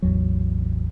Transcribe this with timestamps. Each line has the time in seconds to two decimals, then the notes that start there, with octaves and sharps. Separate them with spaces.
0.02 A1 E2 F#3